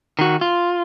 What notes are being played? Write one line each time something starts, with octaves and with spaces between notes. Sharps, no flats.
D#3 F#4
F4